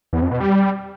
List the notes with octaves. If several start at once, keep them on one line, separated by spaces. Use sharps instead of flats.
E2
F2
B2
G3